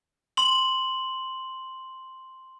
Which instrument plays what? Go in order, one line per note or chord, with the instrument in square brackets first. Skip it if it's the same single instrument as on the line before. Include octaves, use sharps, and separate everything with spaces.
[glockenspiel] C6 F#7